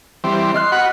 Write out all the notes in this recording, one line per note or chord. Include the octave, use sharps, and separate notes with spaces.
E3 G3 C4
D#5 C6 F6 F#6
F#4 F#5 B5